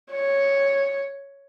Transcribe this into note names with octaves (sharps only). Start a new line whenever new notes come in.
C#5